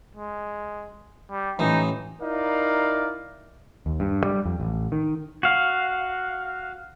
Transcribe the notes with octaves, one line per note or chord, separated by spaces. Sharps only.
G#3
G3
A1 E3 D#4
D#4 E4 A#4 D5 F5
D#2
G2
G3
F2
A1
D#3
F#4 F5